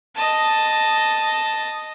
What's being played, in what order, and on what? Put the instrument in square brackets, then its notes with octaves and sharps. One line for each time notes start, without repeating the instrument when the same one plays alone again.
[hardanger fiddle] D#5 A5